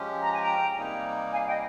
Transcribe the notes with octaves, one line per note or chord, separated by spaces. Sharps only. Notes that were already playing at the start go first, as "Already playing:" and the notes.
Already playing: F3 G#3 C#4 G4
A#5
G#5
G5 A#5
C3 G3 A#3 D#4
F5 G#5
D#5 G5